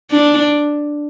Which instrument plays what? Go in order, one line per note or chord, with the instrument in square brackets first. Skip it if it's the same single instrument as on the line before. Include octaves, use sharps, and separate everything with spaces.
[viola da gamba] D4